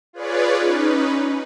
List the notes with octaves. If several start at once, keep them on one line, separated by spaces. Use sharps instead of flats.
F4 G#4 B4 C#5 D5
C#4 D#4 B4